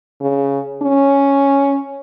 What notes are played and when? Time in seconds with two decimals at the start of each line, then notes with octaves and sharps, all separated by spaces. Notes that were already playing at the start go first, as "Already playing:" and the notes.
0.20 C#3
0.82 C#4